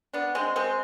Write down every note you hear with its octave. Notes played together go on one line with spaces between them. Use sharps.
B3 D4
G#3 C4
G#3 C4